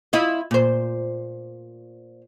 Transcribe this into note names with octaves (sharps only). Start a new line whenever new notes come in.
E4 F4 D#5
A#2 C5